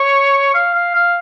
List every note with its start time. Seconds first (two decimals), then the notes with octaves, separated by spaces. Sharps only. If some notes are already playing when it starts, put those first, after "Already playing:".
Already playing: C#5
0.54 F5
0.74 F5
0.95 F5